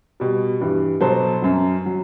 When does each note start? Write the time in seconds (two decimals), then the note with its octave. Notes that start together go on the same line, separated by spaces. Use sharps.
0.20 B2 G3
0.60 G2 E3 G3
1.01 B2 F#3 A4 C5
1.42 F#2 F#3
1.86 F#3